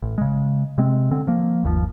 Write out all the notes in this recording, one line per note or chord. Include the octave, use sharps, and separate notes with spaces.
A1
C#3 G#3
C3 G#3 C4
D3 C4
F3 A#3
G1 D#2 B2 F3